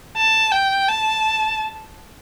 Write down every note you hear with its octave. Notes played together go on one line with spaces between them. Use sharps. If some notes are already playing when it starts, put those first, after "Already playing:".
A5
G5
A5